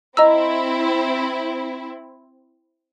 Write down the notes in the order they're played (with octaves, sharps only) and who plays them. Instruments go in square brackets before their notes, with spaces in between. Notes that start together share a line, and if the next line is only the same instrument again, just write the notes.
[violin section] C4 E4 [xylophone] D#5 A#5 E6